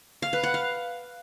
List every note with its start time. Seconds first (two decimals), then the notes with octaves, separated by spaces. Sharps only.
0.22 F5
0.33 B4
0.43 F#5
0.54 F5